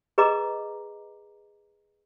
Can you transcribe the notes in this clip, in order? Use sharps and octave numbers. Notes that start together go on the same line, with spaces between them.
G#4 B4 D#5 A#5 D6